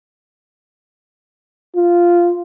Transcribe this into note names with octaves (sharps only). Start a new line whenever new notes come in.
F4